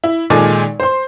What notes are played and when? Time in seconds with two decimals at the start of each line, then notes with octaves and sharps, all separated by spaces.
0.04 E4
0.30 A#2 D#3 G#3 A4 G#5 D6
0.80 C5 C6